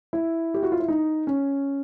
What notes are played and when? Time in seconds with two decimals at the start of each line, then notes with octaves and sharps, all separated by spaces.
0.13 E4
0.54 G4
0.63 F#4
0.72 F4
0.80 E4
0.88 D#4
1.27 C#4